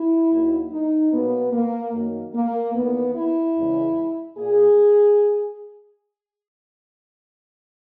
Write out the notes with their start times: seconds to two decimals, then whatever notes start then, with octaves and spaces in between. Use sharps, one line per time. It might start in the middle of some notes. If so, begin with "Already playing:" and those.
Already playing: E4
0.31 D#2 D#3 F#3 A#3
0.72 D#4
1.12 B2 F#3 A#3 B3
1.53 A#3
1.94 F#2 D#3 F#3 A#3
2.35 A#3
2.74 E2 D#3 A#3 B3
3.16 E4
3.56 E2 C#3 G#3
4.38 A#2 A#3 G#4